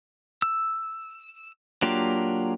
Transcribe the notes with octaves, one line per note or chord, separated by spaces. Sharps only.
E6
F#3 A#3 D4 F4 G4